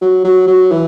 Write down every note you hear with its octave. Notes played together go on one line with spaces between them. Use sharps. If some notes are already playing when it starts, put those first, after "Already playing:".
F#3
F#3
F#3
E3